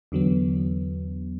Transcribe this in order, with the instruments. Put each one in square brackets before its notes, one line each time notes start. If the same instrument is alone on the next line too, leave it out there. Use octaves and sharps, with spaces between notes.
[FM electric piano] E2 D3 F#3 B3